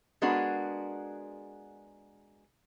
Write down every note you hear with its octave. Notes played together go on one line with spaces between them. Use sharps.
G#3 B3 D4 F#4 G#4 A#4